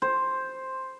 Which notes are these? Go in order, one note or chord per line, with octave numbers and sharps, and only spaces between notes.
C5